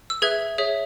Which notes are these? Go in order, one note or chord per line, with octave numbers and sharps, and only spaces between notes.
E6
G#4 B4 E5 G#6
G#4 C#5 E5